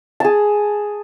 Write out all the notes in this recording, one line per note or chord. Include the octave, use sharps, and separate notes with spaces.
G#4 A5